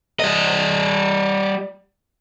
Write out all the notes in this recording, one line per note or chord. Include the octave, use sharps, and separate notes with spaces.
G3 D#5